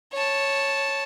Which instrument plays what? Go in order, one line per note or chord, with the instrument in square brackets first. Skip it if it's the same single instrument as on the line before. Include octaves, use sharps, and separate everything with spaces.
[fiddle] C#5 A5